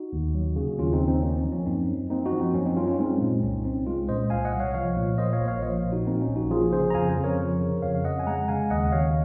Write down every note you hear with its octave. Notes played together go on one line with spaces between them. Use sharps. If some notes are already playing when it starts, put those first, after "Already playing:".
Already playing: D#4 F#4
D#2
F#3
C#3
D#2 C#4 F4
C4 D#4
D#2
C4 D#4
A#3 C#4
C4
F3
C#4
F#2 C4 D#4
F#2
A#3 C4 D#4
D#4 F#4
F3
C4
F#2 C#4
C4 D#4
F#2 C#4 F4
C#4 F4
G#3 C4 D#4
A#2
C2 C#4
C2 C4 D#4
G#3 C#4 F4
A#2 C5 D#5
C2 F5 G#5
D#5 F#5
C2
C#5 F5
F3 C#5 F5
A#2
A#3 C5 D#5
C#5 F5
A#1
C#5 F5
F3 C5 D#5
A#2
D#4 F#4
A#3 C4 D#4
C#4
A#1
D#4 F#4
F3 F4 G#4
C#3 G#4 C5
A#5
F2 F5 G#5
G#4 C5
F2
A#4 C#5
F3
C#3
F2 C#5 F5
F5
F2 D#5 F#5
G#5
G#3 F#5 A#5
C#3 F5 G#5
D#2 D#5 F#5
D#2 C#5 F5